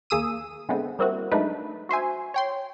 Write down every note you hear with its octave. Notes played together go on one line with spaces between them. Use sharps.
D#2 A#3 G#4 D#6 E6 D#7
D3 G#3 A3 B3 C4
G3 A#3 C4 E4 F#4
F#3 G#3 A3 D4 D#4 B4
F#4 C5 E5 G#5
C#5 G5 C6